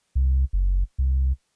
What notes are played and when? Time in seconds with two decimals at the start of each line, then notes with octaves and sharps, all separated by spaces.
0.15 C2
0.53 F#1
0.98 C2